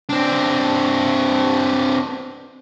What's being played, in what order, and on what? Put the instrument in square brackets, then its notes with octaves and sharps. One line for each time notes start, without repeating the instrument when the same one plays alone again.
[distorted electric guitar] C4 D4